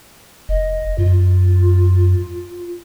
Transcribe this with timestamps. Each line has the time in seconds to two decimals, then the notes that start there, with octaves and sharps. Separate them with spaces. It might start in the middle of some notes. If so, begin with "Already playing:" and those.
0.49 F1 D#5
0.98 F#2 F4